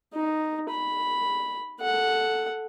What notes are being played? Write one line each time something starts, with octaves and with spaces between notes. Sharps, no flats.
D#4
B5
A4 F#5